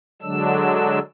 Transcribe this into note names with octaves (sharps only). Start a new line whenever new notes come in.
D3 F#3 G#3 D4 E6